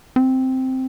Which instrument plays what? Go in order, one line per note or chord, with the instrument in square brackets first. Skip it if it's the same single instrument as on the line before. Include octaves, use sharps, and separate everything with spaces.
[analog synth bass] C4